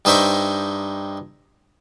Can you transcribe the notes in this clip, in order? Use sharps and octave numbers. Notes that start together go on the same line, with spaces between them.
G2 D#4 C5 E5 G5 C#6